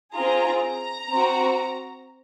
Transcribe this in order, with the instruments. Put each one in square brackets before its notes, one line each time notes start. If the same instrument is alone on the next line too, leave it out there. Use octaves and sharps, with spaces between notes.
[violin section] C4 F4 G#4 A#5
A#5
C4 F#4